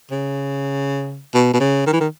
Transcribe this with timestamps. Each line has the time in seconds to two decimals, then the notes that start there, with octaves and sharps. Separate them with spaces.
0.11 C#3
1.34 B2
1.53 B2
1.60 C#3
1.86 D#3
1.93 E3
2.00 D#3